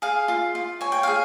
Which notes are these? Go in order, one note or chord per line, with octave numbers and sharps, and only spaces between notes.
G#4 F5
F4
F4
C#5 G#5
G5
G#4 F5